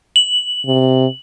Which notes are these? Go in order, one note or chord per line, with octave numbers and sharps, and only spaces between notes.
F#7
C3